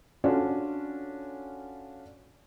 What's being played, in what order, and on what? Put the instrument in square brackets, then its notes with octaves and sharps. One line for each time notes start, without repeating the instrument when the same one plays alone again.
[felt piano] C#4 D4 F4 F#4 A4